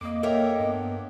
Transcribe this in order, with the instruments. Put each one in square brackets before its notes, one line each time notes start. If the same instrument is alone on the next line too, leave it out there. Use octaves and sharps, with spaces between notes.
[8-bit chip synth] F2 [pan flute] A#3 [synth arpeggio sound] D#5 D6
[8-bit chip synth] A4 C#5 E5 [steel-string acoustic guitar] A#4 G5
[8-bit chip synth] G2 [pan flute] B3